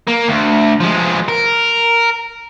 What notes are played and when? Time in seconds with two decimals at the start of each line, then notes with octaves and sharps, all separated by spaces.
0.08 A#3
0.28 D2
0.80 F3 G#3
1.28 A#4